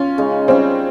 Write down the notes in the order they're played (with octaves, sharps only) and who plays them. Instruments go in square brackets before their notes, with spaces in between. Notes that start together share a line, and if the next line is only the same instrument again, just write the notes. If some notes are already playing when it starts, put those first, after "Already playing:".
Already playing: [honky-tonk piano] C#4 [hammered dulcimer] F4
[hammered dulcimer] C#3 G#3 D#4
[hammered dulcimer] G3 C#4 F4 [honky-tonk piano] C4